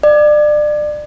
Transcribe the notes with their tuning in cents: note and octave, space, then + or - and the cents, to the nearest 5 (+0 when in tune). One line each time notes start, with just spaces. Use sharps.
D5 +30